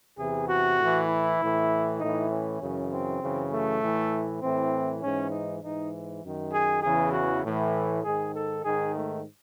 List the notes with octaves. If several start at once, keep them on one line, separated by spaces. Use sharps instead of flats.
E2 C3 E3 G#4
F#4
A2 E3
E4
A2 E3
A2 E3 D#4
C#4
F#2 C#3 E3
C4
F#2 C#3 E3
A3
A2 E3
A2 E3 C4
G#2 E3 C#4
D#4
G#2 E3 D#4
F#2 D#3
G#4
E2 C#3 E3 G#4
F#4
A2 E3
G#2 D#3 G#4
A4
G#2 D#3 G#4
A3